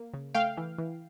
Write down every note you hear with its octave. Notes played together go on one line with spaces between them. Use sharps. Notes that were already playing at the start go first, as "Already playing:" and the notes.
Already playing: A#3
C#3
A3 F5 G5
E3
E3